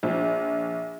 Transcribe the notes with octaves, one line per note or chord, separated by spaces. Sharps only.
A#1